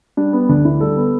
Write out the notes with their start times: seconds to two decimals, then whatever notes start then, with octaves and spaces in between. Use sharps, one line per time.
0.17 G3 D4
0.33 B3
0.49 D2 D4
0.65 D3 E4
0.80 G3 A4
0.97 B3